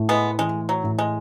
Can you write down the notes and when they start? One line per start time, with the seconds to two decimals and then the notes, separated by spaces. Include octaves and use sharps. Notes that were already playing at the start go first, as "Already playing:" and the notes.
Already playing: A2 A3
0.09 G#3 B3
0.39 E3 G#3
0.69 F#3
0.84 A2
0.99 G#3